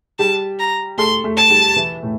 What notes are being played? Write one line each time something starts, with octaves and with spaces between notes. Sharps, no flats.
G3 G4 A5
A#5
A3 A4 C6
A3 A4
A5
G3 G4
E3 E4
A2 A3